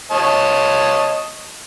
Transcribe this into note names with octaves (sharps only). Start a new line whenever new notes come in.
C#5 D#5 A5